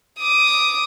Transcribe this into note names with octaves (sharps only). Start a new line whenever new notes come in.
D6 D#6